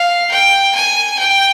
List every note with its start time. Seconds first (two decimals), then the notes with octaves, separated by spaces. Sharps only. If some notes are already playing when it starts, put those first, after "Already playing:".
Already playing: F5
0.32 G5
0.75 G#5
1.19 G5